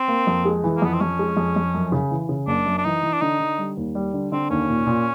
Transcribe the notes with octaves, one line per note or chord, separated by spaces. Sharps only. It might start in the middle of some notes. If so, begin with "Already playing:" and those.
Already playing: C4
A#3
F2
G#3
E3
A#3
F2 B3
C4
F2 C#4
G#3
F2
F2
F#2
C#3
E3
C#3
F#1 D4
F#2
D4
E3 D#4
E3
D4
D3 D#4
D3
G3
D#2
G3
D3
D3 C4
D#2 C#4
A#2
A#2